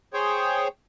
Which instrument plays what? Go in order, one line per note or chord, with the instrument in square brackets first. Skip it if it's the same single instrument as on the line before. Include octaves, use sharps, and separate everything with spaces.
[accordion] G#4 C5 C#5 G5